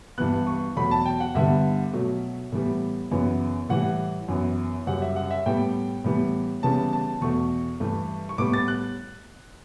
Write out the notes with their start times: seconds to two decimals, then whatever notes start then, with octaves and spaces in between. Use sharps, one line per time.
0.18 G2 E3 B3 F#6
0.47 C#6
0.76 E2 B2 F#3 A3 B5
0.91 A5
1.06 G5
1.20 F#5
1.35 G2 D3 G3 B3 E5
1.93 B2 F#3 A3
2.52 A2 E3 G3 B3
3.11 F#2 C#3 E3 B3
3.69 A2 E3 G3 F#5
4.28 F#2 E3 B3
4.87 F#2 C#3 G3 F#5
5.02 E5
5.16 F#5
5.31 E5
5.46 A2 G3 B3 G5
6.04 A2 E3 G3 B3
6.63 C#3 E3 G3 B3 A5
6.93 A5
7.21 E2 B2 A3 C#6
7.80 G2 E3 A3
8.29 C#6
8.38 A2 G3 B3 D6
8.53 A6
8.68 F#6